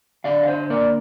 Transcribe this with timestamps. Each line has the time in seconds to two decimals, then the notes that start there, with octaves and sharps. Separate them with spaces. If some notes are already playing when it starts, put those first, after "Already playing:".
0.24 D3 D5 F5
0.43 F5
0.47 C5 D#5
0.70 A#3 A#4 D5